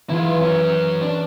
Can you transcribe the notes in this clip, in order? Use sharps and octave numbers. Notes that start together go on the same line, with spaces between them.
E3 E4 F4 G#4
F#2 C#4
D4